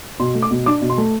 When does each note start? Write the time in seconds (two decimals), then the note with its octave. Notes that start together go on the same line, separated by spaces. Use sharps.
0.19 B2 C6
0.35 A3
0.42 D6
0.50 B2
0.66 D4 D6
0.81 B2
0.90 C6
0.98 A3